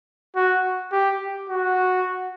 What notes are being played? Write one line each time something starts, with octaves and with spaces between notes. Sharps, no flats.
F#4
G4
F#4